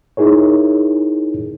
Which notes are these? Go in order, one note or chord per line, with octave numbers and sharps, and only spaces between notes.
D#4 E4 G#4 A#4 C#5